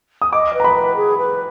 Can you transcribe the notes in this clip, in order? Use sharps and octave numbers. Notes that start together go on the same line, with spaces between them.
D#6
D#5 D6
B4
A#5
B5
B4
G#4
B4